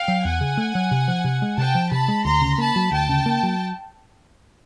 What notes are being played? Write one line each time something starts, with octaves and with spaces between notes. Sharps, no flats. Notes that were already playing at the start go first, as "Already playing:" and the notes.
Already playing: F5 G5
F#3
E2 F#5 G#5
C#3
A3
F#3
C3
F3
C3
G#3
C3 G5 A5
F3
C3 A5 B5
G#3
D2 A#5 C6
C#3
A#3 A5 B5
F#3
D2 G5 A5
C#3
A#3
F#3